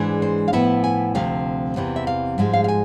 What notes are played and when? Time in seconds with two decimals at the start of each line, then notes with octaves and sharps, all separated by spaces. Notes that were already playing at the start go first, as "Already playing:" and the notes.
Already playing: G#2 E3 G#3 D4 D5
0.22 C5
0.48 F5
0.53 A2 F3 B3 E4 E5
0.84 G#5
1.15 D2 C3 F3 A3 F5
1.76 E2 C3 E3
1.96 E5
2.07 F5
2.38 G#2 F3 G#3
2.53 F5
2.64 F5
2.68 G#5